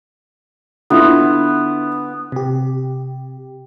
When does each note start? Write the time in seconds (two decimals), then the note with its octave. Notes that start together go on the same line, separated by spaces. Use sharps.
0.90 D3 B3 E4 F4
2.32 C3 G4